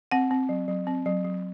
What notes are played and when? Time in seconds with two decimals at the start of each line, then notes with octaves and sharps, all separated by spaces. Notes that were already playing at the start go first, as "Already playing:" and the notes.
0.12 C4 F#5
0.31 C4
0.49 F#3
0.68 F#3
0.87 C4
1.06 F#3
1.25 F#3